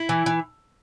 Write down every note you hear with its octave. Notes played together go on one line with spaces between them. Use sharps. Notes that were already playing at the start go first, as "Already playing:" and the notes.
Already playing: E4
E3
E3